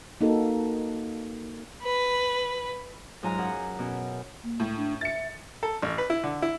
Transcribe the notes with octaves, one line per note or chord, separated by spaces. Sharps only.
A#3 D#4 F#4 A4
B4
G#2 F#3 F4 G#5 A#5
F#2 G#4 F#5
B2 C#4
A#3
A2
D4
E5 A6 C#7
A4
A1
B4
E4
D3
E4